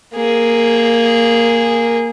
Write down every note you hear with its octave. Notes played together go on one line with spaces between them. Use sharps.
A#3 G#4